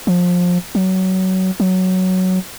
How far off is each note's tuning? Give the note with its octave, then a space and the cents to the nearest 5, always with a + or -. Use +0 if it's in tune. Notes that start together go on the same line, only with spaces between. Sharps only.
F3 +25
F#3 +20
F#3 +5